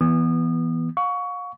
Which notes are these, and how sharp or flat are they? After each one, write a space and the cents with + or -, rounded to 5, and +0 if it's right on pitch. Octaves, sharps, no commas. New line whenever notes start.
E3 +0 B3 -15 D#6 -30
F5 +40 C#6 +20